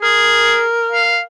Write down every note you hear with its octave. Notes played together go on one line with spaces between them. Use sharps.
G#4 A#4
F5